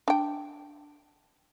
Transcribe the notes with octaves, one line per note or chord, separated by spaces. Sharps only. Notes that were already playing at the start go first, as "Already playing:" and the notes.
D4 G5